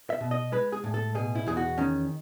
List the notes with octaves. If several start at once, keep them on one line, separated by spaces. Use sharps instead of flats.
E5
B2
D#5
G#3 B4
G#4
A2
A4
B2 G#4
E4
E2 G#4
F#4
D#3 C#4